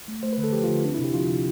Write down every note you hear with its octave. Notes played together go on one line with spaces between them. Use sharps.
A3
A3 C5
B4
D3
A4
F3 G4
D3 F4
C4 D4
C3 E4
G4
F3 F4
C3